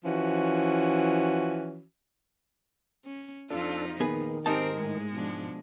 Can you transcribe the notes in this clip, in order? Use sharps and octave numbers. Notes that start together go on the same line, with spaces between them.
E3 F3 C#4 F#4
C#4
F2 D4 D#4 F4 A4
A#2 D#3 B3 G#4 B4
G#2 C4 D#4 G4 A#4 C5 A5
A2 G#3
B2 F3 D4